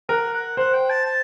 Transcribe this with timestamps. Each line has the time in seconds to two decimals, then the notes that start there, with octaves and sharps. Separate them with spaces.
0.09 A#4 F#5
0.33 F#5
0.57 C5 F#5
0.73 G5
0.90 A5
1.05 A5